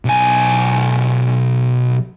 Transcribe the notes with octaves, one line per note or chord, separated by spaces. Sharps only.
B1 G#5